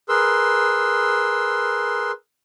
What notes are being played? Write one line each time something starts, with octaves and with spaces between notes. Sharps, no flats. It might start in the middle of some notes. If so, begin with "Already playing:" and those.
G#4 A#4 B4 C6 E6